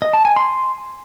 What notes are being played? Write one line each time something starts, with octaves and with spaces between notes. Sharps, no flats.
D#5
A5
G#5
C6